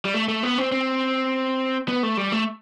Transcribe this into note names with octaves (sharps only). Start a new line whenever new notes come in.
G3
A3
A3
B3
C4
C4
B3
A3
G3
A3